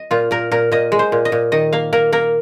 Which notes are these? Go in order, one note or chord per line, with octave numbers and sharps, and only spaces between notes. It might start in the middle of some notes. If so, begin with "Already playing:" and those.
Already playing: D#5
A#2 F4
A#2 A#4
A#2 A#4
A#2 D#5
G#3
C5
A#2
D#5
A#2
D#3 D#5
A#3 F5
A#3 A#4
A#3 A#4